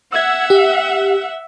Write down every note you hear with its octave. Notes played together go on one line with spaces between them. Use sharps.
E5 F#5 E6 G#6
G4